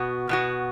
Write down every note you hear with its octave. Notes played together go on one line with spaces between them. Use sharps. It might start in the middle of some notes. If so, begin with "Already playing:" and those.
Already playing: B2 B3 F#4
B2 B3 F#4